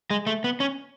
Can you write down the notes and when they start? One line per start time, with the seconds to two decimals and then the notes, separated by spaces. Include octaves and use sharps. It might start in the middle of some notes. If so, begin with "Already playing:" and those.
0.11 G#3
0.27 A3
0.44 B3
0.60 C#4